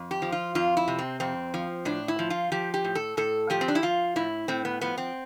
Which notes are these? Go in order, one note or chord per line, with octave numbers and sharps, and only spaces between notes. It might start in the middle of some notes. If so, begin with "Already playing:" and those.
Already playing: F2
G4
F3
F4
F2 F4
E4
C3
C4
F2 C4
F3
A2 D4
E4
F3
F4
F3 G4
G4
A2
A4
A2 A4
F3 G4
C4
D4
E4
F3 F4
A2 E4
A2 C4
B3
F3 B3
C4